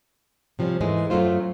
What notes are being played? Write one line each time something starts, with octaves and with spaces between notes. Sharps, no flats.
C3 F3 G3 C4 C#4
G#2 E3 G#3 A3
F#2 F#3 A3 F4 C5